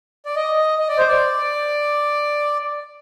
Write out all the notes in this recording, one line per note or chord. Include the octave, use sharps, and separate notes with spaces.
D5
D#5
D#5
D5
C5
D5